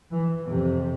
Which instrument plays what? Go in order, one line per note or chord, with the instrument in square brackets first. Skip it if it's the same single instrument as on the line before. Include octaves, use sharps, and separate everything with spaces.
[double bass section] E3
F2 C3